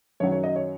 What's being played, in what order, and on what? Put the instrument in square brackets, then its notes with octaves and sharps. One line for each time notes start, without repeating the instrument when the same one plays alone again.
[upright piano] F#2 D#3 F#3 C#5
C#5
D#5
C#5